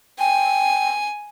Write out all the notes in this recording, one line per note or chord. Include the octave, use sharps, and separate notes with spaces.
G5 G#5